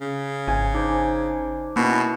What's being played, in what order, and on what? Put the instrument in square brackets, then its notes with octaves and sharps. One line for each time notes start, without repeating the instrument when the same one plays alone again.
[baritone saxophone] C#3
[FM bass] G#1 [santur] G#5
[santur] D4 [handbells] D#4 C5
[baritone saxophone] B2 [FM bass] A#3 [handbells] C#4 E4